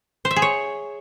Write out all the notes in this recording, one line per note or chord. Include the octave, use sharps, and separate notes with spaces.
C5
E5
G#4
C#5